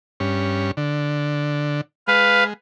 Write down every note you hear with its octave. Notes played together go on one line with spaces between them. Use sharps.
G2 C#4
D3
G#3 B4 F5